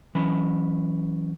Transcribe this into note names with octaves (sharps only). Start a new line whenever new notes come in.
E3 F#3 C#4 B5